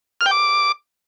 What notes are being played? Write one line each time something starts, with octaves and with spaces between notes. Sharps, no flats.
F6
G5
D6